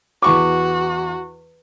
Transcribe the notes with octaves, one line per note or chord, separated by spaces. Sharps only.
E2 F#4 C#6 D6